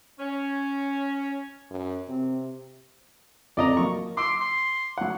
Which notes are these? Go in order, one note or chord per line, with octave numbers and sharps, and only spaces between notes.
C#4
F#2
C3 C4
F2 D5 D#5 A#5
F#3 A#3 C#6
C6 D6 E6 D7
C6
F#3 F#5